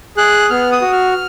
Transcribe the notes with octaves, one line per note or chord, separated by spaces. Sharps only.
G#4 F#6
B3 F6
D#6
F#4
F6